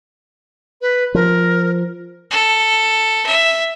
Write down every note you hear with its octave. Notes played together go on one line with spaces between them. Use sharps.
B4
F3 A#4
A4
E5